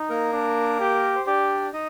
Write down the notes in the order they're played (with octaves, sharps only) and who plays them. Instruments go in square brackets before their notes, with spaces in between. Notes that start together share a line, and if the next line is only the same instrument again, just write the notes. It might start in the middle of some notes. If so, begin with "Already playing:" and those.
Already playing: [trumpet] D#4
[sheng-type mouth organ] A#3 A#4
[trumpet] D4
G4
[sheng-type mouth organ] C5
[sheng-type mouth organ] D4 D5 [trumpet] G4
[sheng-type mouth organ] D#4 D#5